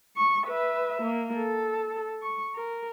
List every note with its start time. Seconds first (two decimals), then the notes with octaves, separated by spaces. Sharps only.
0.17 C#6
0.47 B4 E5
1.02 A#3
1.35 A4
2.22 C#6
2.55 A#4